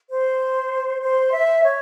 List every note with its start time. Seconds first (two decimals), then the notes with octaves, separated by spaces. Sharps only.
0.11 C5
1.02 C5
1.33 E5
1.63 C#5